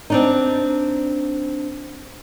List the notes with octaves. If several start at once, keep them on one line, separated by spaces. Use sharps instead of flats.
C4 D4 D#4